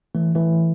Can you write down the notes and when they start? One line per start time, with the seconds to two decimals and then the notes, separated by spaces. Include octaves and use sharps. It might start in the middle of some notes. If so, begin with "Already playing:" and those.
0.15 E3 A3
0.35 E3 A3